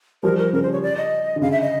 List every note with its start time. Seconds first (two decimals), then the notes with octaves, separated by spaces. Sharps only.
0.23 F3 G3 A#4
0.39 A#4
0.53 C#3 A#4
0.63 C5
0.73 C#5
0.83 D5
0.97 D#5
1.36 D3
1.41 C#3 F5
1.52 E5
1.62 D#5